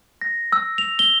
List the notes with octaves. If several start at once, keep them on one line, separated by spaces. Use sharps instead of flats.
A#6
E6
F7
G7